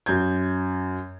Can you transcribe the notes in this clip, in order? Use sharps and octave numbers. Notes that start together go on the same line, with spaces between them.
F#2 G6 G#6